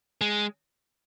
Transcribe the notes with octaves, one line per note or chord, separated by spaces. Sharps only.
G#3